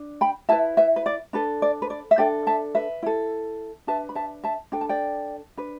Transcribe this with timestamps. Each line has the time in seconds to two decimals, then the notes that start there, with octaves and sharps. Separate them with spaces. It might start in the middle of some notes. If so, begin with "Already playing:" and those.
Already playing: D4
0.21 G5 B5
0.49 E4 B4 E5 A5
0.77 B4 E5
0.96 B4
1.06 D5
1.33 D4 A4 B4
1.62 D5
1.82 B4
1.90 D5
2.11 E5
2.18 D4 A4 D5 G5
2.47 E5 A5
2.75 B4 E5
3.03 E4 A4
3.87 D4 B4 E5 A5
4.09 B5
4.15 E5 A5
4.44 E5 A5
4.72 D4 A4 G5
4.81 A5
4.89 D5 G5
5.57 D4 B4